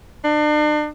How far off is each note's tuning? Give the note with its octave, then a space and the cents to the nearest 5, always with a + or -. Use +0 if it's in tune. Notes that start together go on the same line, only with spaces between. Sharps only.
D4 +40